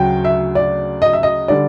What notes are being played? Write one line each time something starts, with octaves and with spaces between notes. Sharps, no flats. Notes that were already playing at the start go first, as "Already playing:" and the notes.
Already playing: D2 C#3 F#3 G5
E5
D5
D#5
E5
D#5
D3 G3 D5